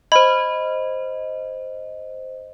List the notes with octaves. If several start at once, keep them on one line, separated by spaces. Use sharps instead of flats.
C5 D#5 B5